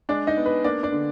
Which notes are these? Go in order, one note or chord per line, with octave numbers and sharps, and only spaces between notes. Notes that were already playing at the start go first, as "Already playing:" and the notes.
G#3 D4 D5
D#4 D#5
B3
B4
A#3 D4 D5
D4 D5
D3